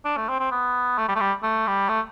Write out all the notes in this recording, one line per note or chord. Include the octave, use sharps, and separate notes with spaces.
D4
A3
C4
C4
B3
A3
G3
A3
G3
A3
G3
A3